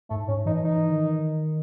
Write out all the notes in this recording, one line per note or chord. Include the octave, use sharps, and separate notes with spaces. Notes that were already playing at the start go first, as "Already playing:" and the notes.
G#2 A3
G#2 C#4
E3 D#4
E3 D#4
D#3